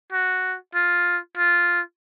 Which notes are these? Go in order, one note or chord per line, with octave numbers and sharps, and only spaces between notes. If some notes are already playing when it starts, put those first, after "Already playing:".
F#4
F4
F4